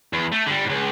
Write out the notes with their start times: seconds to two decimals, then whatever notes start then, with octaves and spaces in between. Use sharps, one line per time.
0.13 E2
0.32 A3
0.46 D3 G3
0.65 C#2 G#2